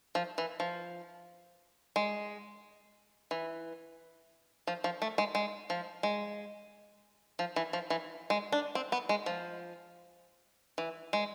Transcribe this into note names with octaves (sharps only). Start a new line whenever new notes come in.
F3
E3
F3
G#3
E3
F3
F3
A3
G#3
G#3
F3
G#3
F3
E3
F3
E3
G#3
D4
C4
B3
G#3
F3
E3
G#3